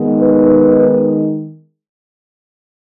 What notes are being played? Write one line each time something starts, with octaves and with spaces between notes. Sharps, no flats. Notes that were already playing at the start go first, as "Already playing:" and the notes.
Already playing: D#3 G#3 B3 D#4
B4